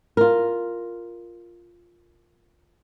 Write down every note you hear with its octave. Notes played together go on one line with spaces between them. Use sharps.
F4 A#4